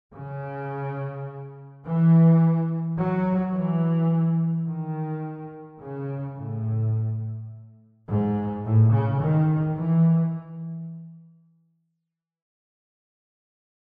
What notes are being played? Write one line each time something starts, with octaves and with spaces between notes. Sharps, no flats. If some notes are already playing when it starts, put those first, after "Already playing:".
C#3
E3
F#3
E3
D#3
C#3
A2
G#2
A2
C#3
D#3
E3